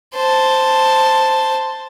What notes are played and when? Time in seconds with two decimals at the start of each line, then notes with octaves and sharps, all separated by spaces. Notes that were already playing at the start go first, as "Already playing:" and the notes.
0.15 C5 A5